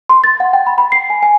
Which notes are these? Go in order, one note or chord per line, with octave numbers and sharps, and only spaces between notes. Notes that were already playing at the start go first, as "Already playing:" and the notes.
C6
A6
F#5
G5
B5
B5
C7
G#5
G#5